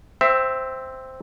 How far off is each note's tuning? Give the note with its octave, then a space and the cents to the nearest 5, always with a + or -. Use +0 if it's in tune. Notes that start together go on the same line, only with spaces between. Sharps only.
C4 +0 E5 +10